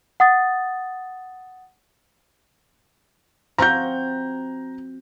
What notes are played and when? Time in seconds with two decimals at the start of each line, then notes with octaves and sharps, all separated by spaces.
0.20 F#5 D#6 A6
3.58 F3 C4 F#4 A#5 G6